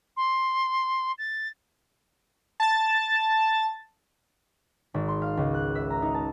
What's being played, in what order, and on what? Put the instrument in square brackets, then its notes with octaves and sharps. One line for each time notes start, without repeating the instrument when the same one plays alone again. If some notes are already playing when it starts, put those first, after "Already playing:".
[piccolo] C6
A6
[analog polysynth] A5 A6
[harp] G#1
C6
F5
C#2
F#6
E5
A#5
D#4
A5